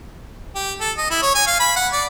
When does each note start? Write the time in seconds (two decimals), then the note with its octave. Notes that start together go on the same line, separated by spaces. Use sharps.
0.56 G4
0.81 A4
0.98 D#5
1.11 E4
1.22 C#5
1.35 G#5
1.47 F5
1.60 B5
1.76 F#5
1.93 D5